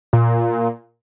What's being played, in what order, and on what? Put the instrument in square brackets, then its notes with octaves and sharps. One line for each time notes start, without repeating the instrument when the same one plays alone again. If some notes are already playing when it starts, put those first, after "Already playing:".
[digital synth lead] A#2